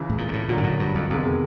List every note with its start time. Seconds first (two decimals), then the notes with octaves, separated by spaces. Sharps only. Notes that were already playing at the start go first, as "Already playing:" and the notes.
Already playing: C#2 C#3 E3
0.10 A2
0.18 A#2
0.28 A#2
0.33 A2
0.49 A#2 D3 F#3 A#3
0.57 G#2
0.63 A2
0.79 G2
0.95 F2
1.10 F2 C3 D#3 G#3 B3